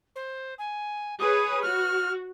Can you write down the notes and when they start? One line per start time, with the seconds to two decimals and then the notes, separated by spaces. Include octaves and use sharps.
0.15 C5
0.58 G#5
1.19 G#4 B4 C#5 D#6
1.62 F#4 F6